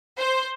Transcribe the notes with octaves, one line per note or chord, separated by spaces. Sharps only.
C5